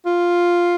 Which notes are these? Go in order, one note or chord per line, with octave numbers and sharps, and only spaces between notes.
F4